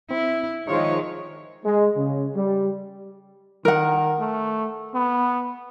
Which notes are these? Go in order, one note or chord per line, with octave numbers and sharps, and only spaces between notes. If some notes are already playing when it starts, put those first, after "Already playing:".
C4 E4
D#3 F3 G#3 D#4 F4 C5 C#5
G#3
C#3
G3
D#3 A#4 F#5
A3
B3